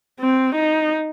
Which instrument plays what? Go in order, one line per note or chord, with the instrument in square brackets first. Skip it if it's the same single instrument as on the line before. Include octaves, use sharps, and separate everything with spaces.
[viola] C4
D#4